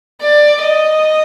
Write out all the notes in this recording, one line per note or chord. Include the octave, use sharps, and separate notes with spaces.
D5
D#5